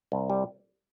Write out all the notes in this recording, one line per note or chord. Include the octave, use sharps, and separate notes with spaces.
C2
G3